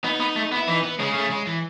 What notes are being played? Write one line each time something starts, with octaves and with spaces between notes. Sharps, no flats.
B3 D#4
B3
A3
B3
E4
E3 D#4
B3
C#3 G#3
A3
G#3
E3